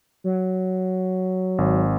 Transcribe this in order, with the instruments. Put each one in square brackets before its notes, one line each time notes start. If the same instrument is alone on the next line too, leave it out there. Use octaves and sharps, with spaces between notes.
[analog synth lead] F#3
[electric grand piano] G#1